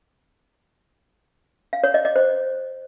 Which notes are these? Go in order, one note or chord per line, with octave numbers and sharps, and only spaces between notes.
F5
C#5
D#5
D#5
C5